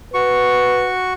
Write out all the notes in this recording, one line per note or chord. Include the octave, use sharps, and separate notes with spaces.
F#4 B4 C#6